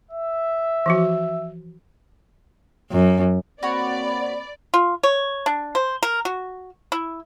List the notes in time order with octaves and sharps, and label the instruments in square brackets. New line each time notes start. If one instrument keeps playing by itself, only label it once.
[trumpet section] E5
[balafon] E3 F3 F#4
[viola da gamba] F#2
[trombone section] A#3 C4 [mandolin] F#4 C#5 [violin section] D5 [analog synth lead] B5
[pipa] F4
C#5
D4
C5
A#4
F#4
E4